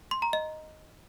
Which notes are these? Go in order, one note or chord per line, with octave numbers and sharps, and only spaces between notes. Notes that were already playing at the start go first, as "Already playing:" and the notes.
C6
A#5
D#5